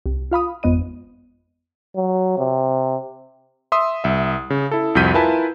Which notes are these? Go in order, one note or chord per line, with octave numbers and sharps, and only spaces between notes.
C2
F4 F5 B5 D#6
G#1 F2 B3 D#5 D#7
F#3
C3
E5 C6 D#6
C2 E5
C#3
E4 A4
C2 F2 F#4 G6 B6 D#7
E4 F4 A#4 B4 G#5 A5